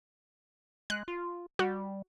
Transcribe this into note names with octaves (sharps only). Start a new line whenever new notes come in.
G#3 F#6
F4
G3 F#4